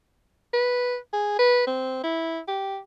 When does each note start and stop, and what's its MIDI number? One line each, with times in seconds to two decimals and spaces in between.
0.53 0.97 71
1.13 1.36 68
1.39 1.66 71
1.67 2.00 60
2.04 2.39 64
2.48 2.78 67